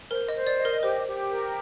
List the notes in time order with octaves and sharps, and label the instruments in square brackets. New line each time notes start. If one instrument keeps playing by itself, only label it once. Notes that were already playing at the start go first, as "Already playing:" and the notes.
[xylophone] A#4 [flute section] C5
[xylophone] D#5
[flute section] C5
[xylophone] D5
[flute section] D#5
[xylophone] A#4
[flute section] G4 [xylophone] C5
[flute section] G4
A#4